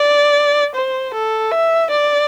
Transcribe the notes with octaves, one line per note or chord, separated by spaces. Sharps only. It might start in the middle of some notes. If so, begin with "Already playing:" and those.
Already playing: D5
C5
A4
E5
D5